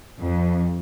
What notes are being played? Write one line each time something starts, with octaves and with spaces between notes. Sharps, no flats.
F2